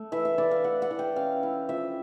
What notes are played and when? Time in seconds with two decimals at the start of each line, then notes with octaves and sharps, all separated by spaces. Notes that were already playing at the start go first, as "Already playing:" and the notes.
Already playing: A3
0.12 E3 E5
0.25 E5
0.38 E3 D5
0.51 F5
0.64 E3 F#5
0.82 F#5
0.91 E3
0.99 G5
1.16 C#4 F5
1.43 E4
1.69 F3 E5